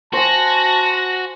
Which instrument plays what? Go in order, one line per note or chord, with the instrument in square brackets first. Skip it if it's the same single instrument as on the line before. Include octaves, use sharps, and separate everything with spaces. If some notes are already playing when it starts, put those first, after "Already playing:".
[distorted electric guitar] F#4 [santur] C5 G#5 [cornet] A5 [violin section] F#6 A#6